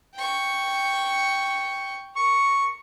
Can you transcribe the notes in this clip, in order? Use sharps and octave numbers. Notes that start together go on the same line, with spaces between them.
G5 C#6
A#4 C#6